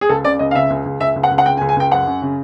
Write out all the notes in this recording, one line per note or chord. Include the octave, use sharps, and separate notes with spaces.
G#4
C#2 A4
C#3 D5
C#2 D#5
F5
C#3 E5
C#2
C#2
C#2 E5
C#2
F#5
C#2
F#5
C#3 G5
G#5
C#2
G#5
C#2 G5
F#2 F#5
F#2
C#3